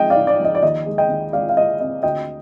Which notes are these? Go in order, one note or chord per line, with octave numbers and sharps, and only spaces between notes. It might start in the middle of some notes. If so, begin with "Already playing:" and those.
Already playing: G#2 F3 G#3 D#5 G5
D5 F5
G#2
D5
F3
D#5
D5
D#2 D#5
G#3
D#5 G5
D#2
G#3 D5 F5
F5
G#3 D#5
C4 D#5
D2 D#5 G5